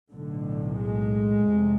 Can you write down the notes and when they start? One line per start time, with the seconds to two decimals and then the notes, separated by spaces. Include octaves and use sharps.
0.11 B1 A2 D3
0.78 G#3
1.45 F1 F2 C3